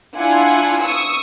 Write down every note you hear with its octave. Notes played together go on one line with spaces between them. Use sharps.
D4 E4 F4 F#5 G#5
C#6 D#6 E6